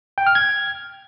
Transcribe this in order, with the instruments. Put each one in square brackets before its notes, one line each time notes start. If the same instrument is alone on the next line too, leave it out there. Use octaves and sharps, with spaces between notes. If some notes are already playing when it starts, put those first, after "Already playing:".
[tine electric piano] G5
F6
G#6